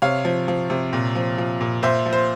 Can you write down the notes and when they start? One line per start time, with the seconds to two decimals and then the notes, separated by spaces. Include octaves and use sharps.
0.02 C3 C#5 F5
0.25 F3
0.48 F3
0.70 C3
0.93 A#2
1.15 F3
1.38 F3
1.61 A#2
1.83 A#2 C5 E5
2.06 F3
2.13 C5